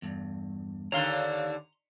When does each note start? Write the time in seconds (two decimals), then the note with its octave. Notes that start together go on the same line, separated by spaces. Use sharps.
0.02 E2 G2
0.92 D#2 D3 C#5 F5 A#5 C6